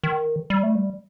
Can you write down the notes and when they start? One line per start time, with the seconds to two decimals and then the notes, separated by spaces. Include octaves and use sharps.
0.04 D#3
0.50 G3
0.63 A3
0.75 G3